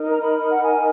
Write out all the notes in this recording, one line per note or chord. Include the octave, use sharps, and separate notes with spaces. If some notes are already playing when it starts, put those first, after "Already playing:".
Already playing: D#4 A#4
A#5
B5
F#5
G#5